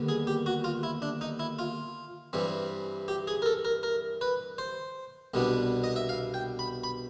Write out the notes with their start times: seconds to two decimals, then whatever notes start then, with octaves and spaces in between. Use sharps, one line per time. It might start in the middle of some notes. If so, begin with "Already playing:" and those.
Already playing: D#2 D3 G3 B3
0.08 G#4
0.27 G4
0.46 F#4
0.64 F4
0.83 E4
1.02 D4
1.21 D#4
1.39 E4
1.59 F4
2.33 G2 E3 G3 C4
3.08 G4
3.27 G#4
3.42 A#4
3.46 A4
3.65 A#4
3.83 A#4
4.21 B4
4.58 C5
5.34 C2 B2 G3 B3 D4
5.84 D#5
5.96 E5
6.09 F5
6.34 G5
6.59 B5
6.84 B5